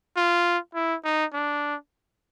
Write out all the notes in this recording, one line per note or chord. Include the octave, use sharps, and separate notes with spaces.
F4
E4
D#4
D4